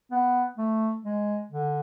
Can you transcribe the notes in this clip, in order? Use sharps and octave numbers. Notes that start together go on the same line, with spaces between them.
B3
A3
G#3
D3